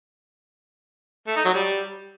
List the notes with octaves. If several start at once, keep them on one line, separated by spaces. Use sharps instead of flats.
A3
D#4
F#3
G3